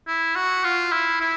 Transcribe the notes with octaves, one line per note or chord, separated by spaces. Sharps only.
E4
F#4
F4
E4
E4